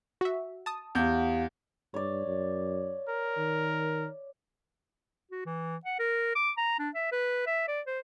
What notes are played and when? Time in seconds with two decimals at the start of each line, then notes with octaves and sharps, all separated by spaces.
0.21 F#4 E5
0.66 A5 D#6
0.95 E2 G4 F5 F#5 G6
1.94 G2 C#5 D5
2.27 F#2
3.09 A#4
3.37 D#3
5.31 F#4
5.45 E3
5.85 F#5
5.99 A#4
6.35 D6
6.57 A#5
6.79 D4
6.95 E5
7.12 B4
7.46 E5
7.68 D5
7.87 C5